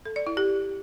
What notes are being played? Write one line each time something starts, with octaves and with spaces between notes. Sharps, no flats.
A4
D5
E4
G4